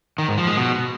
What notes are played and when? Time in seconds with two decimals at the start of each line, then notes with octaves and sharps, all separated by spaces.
0.18 D#3
0.28 G#2
0.38 F3
0.47 G#3
0.57 B2